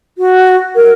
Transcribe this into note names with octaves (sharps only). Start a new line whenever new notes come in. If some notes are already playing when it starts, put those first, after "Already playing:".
F#4
A#4